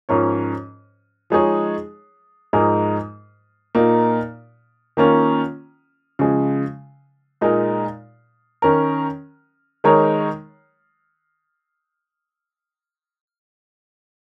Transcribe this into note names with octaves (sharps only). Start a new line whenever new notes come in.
G#2 F3 C#4 A#4 C#5
F3 G#3 D#4 G#4 C#5
G#2 F3 G#3 D#4 A#4
A#2 A#3 D#4
D#3 A#3 C#4 F4
C#3 F3 G#3
A#2 G#3 D#4 A#4
D#3 C#4 A#4
D#3 G#3 D#4 A#4 C#5